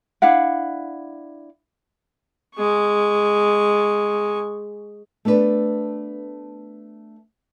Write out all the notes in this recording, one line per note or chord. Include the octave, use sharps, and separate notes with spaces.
D4 E4 F5 F#5
G#3 C#6
A3 B3 D4 B4